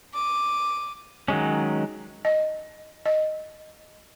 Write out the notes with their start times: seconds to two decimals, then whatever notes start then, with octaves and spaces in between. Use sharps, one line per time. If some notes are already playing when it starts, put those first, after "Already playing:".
0.14 D6 D#7
1.28 D#3 F#3 G#3 C#4
2.25 D#5
3.06 D#5